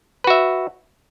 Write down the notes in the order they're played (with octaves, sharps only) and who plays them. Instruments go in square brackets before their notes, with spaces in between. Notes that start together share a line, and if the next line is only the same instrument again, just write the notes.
[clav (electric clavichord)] B4
F#4
E5